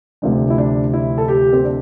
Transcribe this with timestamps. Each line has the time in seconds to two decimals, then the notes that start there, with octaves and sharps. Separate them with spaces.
0.22 D2 C3 F3 D4
0.50 E4
0.58 D4
0.93 E4
1.18 A4
1.28 G4
1.53 C4
1.64 D4